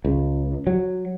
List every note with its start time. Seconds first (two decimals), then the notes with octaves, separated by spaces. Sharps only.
0.05 C#2
0.67 F#3